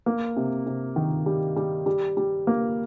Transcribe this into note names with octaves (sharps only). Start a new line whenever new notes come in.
A#3
C3
C3
D#3
G3
G3
G3
G3
A#3